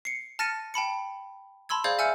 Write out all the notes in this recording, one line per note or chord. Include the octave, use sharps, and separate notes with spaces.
C7 C#7
A5 F6 A6 A#6 C#7 D#7
G5 A5 B5 C#7
A5 B5 C6 E6 G#6
G#4 C5 D5 F5 G6 G#6
E5 G#5 E6 F6 G6 C#7